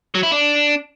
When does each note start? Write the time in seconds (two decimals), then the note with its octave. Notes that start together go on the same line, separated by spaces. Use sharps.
0.15 F#3
0.23 E4
0.32 D4